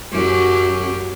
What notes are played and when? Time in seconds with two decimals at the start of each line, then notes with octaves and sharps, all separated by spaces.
0.12 F#2 F#3 G4